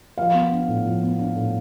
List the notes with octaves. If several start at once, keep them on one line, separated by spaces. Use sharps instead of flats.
F3 F5
B3
D4
A2
F3
B3
D4
A2